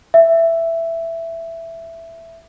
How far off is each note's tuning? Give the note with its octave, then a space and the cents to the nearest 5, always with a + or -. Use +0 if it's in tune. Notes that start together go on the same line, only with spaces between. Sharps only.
E5 +10